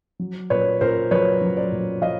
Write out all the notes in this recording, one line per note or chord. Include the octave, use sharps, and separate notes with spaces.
F#3
A#2 B4 C#5
A#2 A#4 C5
F#3 B4 C#5
F#3
C5 D5
A#2
F#3 D#5 F5